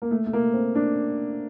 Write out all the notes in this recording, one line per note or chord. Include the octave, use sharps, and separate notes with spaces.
A#3
A3
A3
A#3
C4
D4